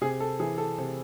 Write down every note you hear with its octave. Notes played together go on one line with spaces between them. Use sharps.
C3 G#4
A4
E3 G#4
A4
C3